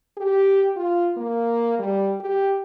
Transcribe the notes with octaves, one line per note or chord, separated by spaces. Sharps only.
G4
F4
A#3
G3
G4